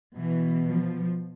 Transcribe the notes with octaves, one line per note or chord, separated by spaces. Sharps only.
B2 E3
F3